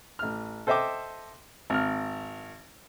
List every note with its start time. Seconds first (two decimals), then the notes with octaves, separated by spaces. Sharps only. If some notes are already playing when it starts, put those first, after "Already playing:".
0.19 A1 F6
0.67 A4 C5 D#5 E5 G5 D6
1.70 G#1 F6